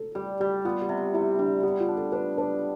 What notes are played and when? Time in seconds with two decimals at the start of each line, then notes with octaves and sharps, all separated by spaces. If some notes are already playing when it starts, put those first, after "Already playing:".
Already playing: A4
0.15 G3 G4
0.40 G3 G4
0.65 B3 F4
0.81 G4
0.89 C3
1.13 C3 E4
1.39 G3 D4
1.63 B3 G4
1.80 F4
1.88 D4
1.96 A4
2.12 D4 B4
2.37 D4 B4